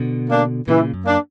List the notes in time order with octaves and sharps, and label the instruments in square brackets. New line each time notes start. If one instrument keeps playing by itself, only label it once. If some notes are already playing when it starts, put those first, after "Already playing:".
Already playing: [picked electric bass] B2 D3
[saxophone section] A#3 D4
[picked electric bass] A#2 C#3 [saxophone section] E3
[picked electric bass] F#2
[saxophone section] A#3 D4